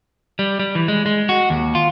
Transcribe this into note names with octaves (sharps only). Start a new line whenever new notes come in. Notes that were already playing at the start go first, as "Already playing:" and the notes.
G3
G3
E3
G#3
G#3
F#4
D#2
F4